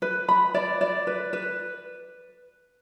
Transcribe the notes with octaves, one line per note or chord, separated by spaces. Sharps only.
B4
B5
D5
D5
B4
B4